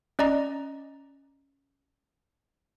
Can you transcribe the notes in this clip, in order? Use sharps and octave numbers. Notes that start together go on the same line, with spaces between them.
C#4 D5 D#5 A#5